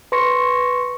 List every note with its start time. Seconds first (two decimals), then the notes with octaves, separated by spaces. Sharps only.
0.12 B4 C6 C#6 A#6 C#7